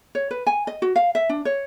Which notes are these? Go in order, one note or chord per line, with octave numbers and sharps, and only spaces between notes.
C#5
B4
G#5
D#5
F#4
F5
E5
D4
C#5